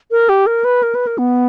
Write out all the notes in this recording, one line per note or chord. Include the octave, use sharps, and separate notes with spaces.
A#4
G4
A#4
B4
A#4
B4
A#4
B3